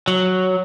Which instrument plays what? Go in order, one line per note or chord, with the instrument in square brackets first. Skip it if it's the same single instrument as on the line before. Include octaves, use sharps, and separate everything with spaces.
[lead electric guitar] F#3